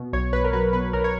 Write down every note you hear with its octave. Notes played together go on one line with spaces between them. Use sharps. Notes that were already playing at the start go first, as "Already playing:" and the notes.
Already playing: B2
B1 C#5
B1 B4
A#4
F#3 B4
B2 B4
B1 A#4
C#5